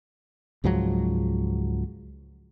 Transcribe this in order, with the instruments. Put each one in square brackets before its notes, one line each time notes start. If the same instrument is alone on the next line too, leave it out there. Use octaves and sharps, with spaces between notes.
[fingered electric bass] C#2 G#2 F3 F#3